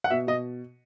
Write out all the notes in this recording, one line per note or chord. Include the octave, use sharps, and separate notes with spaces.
F#5
B2 E5
B2 D#5